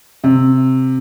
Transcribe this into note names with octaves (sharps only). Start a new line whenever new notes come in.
C3